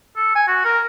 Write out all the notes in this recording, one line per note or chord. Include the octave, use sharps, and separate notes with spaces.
A4
G#5
F#4
A#4